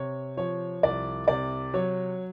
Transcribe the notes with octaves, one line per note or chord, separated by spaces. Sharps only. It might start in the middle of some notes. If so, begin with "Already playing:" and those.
Already playing: C3 C#5
F3 C#5
C2 D5
C3 D5
F#3 C#5